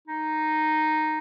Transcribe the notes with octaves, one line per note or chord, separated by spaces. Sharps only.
D#4